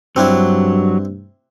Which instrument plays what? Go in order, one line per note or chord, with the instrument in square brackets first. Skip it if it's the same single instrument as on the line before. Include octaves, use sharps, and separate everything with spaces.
[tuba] G2 [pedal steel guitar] F#3 [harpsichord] C4 D4 E4